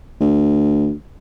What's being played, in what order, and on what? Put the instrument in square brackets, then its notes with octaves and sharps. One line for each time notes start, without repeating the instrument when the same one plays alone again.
[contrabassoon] D2